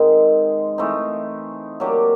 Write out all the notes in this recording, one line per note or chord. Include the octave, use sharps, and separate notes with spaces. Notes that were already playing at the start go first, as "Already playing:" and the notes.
Already playing: G#2 D#3 G#3 C4
E3 A3 C4 D#4
F#3 A#3 D4 G4